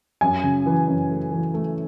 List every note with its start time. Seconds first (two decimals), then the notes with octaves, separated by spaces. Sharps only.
0.21 F#2 G#5
0.43 C#3
0.66 E3
0.88 F#2
1.10 A3
1.31 E3
1.54 A3